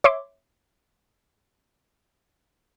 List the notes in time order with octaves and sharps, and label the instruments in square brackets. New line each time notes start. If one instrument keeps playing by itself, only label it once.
[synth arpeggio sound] C#5 E5 C6 D6